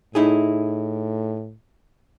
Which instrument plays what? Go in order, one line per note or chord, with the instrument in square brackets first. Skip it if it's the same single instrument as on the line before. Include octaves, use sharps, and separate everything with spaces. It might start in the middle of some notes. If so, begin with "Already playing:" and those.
[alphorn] A2 [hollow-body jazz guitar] D#4 E4 G#4